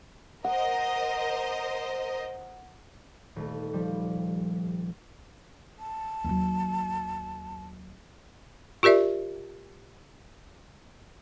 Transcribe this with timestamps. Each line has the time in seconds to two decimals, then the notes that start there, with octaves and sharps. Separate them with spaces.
0.44 A#4 C5 D#5 F#5
3.36 D#1 A3
3.73 F3 G3
5.79 A5
6.24 D#2 F#3
8.83 F4 G4 A#4 D5 E5